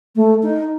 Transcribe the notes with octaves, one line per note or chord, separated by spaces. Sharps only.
A3
D#4